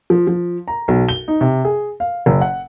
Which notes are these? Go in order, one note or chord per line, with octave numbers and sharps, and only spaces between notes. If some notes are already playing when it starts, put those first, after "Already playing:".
F3
F3
A#5
B1
G7
D#4
C3
G#4
F5
F#1
F#5